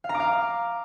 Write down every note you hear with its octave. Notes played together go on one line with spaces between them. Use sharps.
F5
A#5
D6
F5